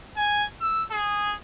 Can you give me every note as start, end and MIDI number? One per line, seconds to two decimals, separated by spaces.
0.17 0.45 80
0.61 0.83 88
0.91 1.35 68